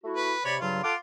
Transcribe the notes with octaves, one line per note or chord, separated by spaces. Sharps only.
A3 E4 F#4
B4
C3 C#5 D5 B5
G2 C#3 F#3 F4
F4 A4 F#5 D6